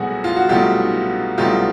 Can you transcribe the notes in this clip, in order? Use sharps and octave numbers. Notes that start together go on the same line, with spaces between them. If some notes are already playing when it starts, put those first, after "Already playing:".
Already playing: C2 B2 F#3 A3 F#4 G#4
F4
F#4
C2 B2 F#3 A3 F4 G4
C2 B2 F#3 A3 F4 G4